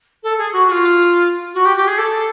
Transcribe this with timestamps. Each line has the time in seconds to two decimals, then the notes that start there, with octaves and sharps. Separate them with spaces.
0.23 A4
0.38 G#4
0.53 F#4
0.67 F#4
0.71 F4
1.54 F#4
1.65 G4
1.77 G4
1.87 G#4
1.98 A4